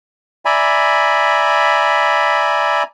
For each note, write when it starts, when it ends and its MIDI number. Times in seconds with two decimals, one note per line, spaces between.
0.45 2.83 74
0.45 2.83 76
0.45 2.83 80
0.45 2.83 82
0.45 2.83 83